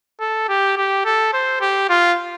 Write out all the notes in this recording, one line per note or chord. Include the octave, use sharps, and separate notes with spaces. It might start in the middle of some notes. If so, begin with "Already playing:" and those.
A4
G4
G4
A4
C5
G4
F4